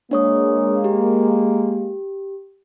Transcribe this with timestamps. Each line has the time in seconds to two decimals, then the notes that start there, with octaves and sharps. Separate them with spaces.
0.11 G#3 A#3 D4 C#5 D#6
0.84 G4